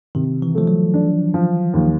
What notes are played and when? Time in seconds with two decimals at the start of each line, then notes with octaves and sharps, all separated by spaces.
0.15 C3 D#3
0.42 E3
0.55 F3 A3
0.67 F#3
0.94 D4
1.34 F3
1.73 D#2